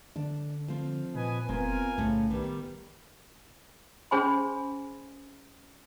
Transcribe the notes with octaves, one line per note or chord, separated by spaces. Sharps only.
D3 D4
F3 C4
A#2 B4 D#5 G#5
F1 B3 C4 F4 A#4 G#5
B1 A2 C#3 A4
D#3 G3 B3
C#4 G#4 C5 G#5 B5 C6